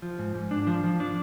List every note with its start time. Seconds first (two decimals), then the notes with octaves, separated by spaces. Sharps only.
0.02 F3
0.19 G#2
0.35 G#2
0.51 D4
0.67 F3
0.84 F3
1.00 D4